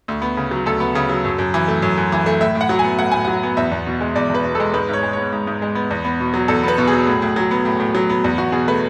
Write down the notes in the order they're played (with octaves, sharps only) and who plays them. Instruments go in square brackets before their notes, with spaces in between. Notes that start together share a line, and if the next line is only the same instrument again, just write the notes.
[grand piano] D2
B3
C#3
F#3
D2 A4
B3
C#3
F#3
F#2
F#2
E3
A3
F#2
F#2
E3
A3
A2 E5
A2
F#5
F#3
G#5
B3
A2 F#5
A2 G#5
F#3 F#5
B3
E2 E5
E2
B2
G#3
E2 D5
E2 B4
B2
G#3 A4
G#2 B4
G#2 C#5
G#3
B3 C#5
G#2
G#2
G#3
B3
E2
B3
B2
F#3
E2 A4
B3 B4
B2
F#3 G#4
A2
A2
F#3
B3
A2
A2
F#3
B3
E2
E2 F#4
B2 G#4
A3 B4